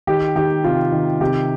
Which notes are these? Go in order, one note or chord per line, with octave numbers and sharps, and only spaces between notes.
D#3 G4
D#3 G4
C3 F4
D#3
C3 G4